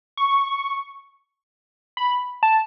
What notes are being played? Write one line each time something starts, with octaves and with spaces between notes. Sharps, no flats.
C#6
B5
A5